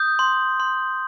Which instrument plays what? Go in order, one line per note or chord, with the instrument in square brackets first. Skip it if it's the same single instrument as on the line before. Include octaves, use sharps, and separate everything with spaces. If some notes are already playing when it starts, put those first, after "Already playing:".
Already playing: [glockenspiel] D#6 G6
C6
C6